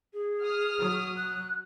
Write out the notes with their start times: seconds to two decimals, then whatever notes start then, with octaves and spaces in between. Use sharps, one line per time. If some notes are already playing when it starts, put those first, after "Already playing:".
0.13 G#4
0.43 D#6 F6
0.79 F#3
1.17 F#6